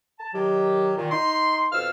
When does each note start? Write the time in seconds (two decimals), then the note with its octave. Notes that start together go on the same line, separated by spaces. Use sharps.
0.19 A5
0.34 D#3 F#3 G4
0.97 A#2 D#3
1.11 D#4 C6
1.72 F2 B2 A4 F5 E6 F6